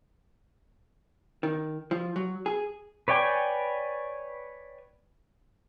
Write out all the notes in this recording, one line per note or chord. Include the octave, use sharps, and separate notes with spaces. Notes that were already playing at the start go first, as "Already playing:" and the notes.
D#3
F3
F#3
G#4
B4 C#5 D5 G5 G#5